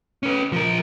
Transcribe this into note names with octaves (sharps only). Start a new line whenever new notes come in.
C#4 B4
F3 A#4